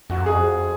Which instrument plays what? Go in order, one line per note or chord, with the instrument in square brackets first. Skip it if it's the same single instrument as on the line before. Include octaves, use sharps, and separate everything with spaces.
[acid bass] F2 [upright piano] F#4
[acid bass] F#2
[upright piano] G#4
[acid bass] F2